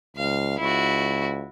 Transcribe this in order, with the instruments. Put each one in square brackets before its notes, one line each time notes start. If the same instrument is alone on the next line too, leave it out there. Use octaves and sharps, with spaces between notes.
[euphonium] C#2 [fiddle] F5
[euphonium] C#2 [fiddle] E4 F#4